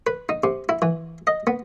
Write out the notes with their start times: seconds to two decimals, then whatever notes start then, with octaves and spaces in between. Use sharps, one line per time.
0.07 B4
0.29 D#4
0.44 C3
0.69 E4
0.82 E3
1.27 D#5
1.47 B3